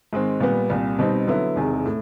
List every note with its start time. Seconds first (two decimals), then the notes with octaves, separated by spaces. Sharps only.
0.13 G#2 D#3 G#3 C4
0.40 A#2 G3 B3
0.70 C2 A#2 G3
0.99 B2 G3 C4 D#4
1.27 D3 F#3 B3 E4
1.56 E1 E2 C3 D#3
1.86 A2